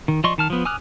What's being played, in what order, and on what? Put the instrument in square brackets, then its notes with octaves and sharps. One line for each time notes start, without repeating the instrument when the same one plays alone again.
[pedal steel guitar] D#3
F3 D5 D#5 C6 C#6
D#3 A5 F6
F3 B3
G#5 D6 D#6 F6 F#6